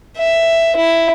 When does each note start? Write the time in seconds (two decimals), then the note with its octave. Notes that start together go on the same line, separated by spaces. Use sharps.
0.18 E5
0.77 E4